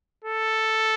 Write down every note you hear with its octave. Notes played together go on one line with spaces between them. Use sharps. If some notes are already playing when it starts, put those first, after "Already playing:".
A4